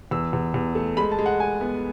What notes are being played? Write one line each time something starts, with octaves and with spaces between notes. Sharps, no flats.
E2 E6
E2
E2
A3
G#3 B5
A5
G#3
F#5
G#3 G#5
B3